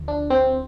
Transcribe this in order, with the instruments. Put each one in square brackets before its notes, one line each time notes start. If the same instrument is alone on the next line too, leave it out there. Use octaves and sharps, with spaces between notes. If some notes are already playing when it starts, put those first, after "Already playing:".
Already playing: [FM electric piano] D2 D3 F3
D4
C4